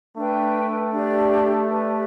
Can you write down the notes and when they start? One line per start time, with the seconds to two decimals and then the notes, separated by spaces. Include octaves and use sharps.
0.16 A3 D4 B4 G5
0.92 D4 G4 D5
1.68 G4 B4 D5